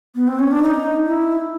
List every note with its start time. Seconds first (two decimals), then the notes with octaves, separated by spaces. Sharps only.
0.15 B3
0.28 C4
0.39 C#4
0.52 D4
0.63 D#4
1.06 E4